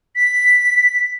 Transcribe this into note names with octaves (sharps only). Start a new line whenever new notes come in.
B6